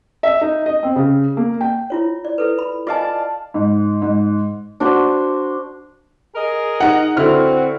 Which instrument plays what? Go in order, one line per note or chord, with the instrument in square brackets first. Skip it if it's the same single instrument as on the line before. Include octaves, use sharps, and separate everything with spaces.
[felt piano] E5
D#4
D#5
C4
C#3
A#3
G5
[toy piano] E4 F4 C#5
D5
E4 A4 B4
B5
[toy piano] F4 D#5 G#5 [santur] D5 F5 A5
[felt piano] G#2
G#2
[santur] D4 F#4 C5
[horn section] G#4 A#4 D#5
[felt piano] D#4 F#5
[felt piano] D3 E4 F6 [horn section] C4 F#4